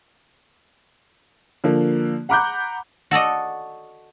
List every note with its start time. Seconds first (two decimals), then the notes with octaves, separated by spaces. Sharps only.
1.64 D3 F3 A#3
2.29 F#5 A#5 B5 D6 F#6 G6
3.11 F#4 A4 D5 D#5